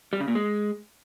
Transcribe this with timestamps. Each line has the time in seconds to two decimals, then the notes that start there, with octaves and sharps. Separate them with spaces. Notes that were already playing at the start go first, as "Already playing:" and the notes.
0.13 G3
0.20 C#3
0.28 A#2
0.35 G#3